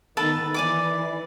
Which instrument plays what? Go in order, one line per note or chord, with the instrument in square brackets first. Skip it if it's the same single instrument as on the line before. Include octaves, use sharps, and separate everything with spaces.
[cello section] D#3 B3 [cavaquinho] A4 B4 A5
[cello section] E3 [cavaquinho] D5 G#5 D6